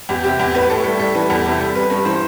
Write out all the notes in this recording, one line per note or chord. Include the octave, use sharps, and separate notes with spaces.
E2 G4
C3 G4
E2 G4
A2 B4
A2 A4
G3 A4
G3 A4
E3 B4
E2 A4
C3 G4
G3 A4
G3 B4
G2
E3 C5